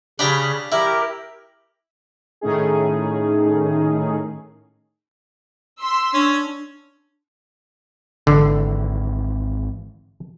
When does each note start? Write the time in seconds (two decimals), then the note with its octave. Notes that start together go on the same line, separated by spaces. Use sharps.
0.19 C#3 D4 G4 A#5 B5
0.72 E4 G4 A#4
2.41 A2 D#3 A3 C#4 D#4 G#4
5.81 C6 E6 B6
6.14 C#4 D4
8.27 G#1 D3 E3